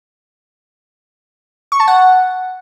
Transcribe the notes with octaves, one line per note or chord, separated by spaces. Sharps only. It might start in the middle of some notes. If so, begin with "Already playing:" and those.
C#6
A5
F#5